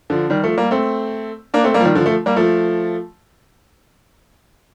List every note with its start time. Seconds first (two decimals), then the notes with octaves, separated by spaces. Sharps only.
0.10 D3 F3
0.30 D#3 G3
0.43 F3 A3
0.58 G3 A#3
0.71 A3 C4
1.54 A#3 D4
1.64 A3 C4
1.74 G3 A#3
1.80 F3
1.85 D#3 G3
1.95 D3 F3
2.06 F3 A3
2.26 G3 A#3
2.36 F3 A3